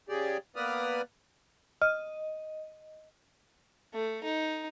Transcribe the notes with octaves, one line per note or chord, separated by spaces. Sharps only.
C#3 G4 G#4 D5
A#3 B3 B4 D5 D#6 F6
D#5 F6
A3
D#4